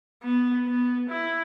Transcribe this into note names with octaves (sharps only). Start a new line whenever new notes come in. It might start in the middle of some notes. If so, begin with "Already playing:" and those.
B3
B3
E4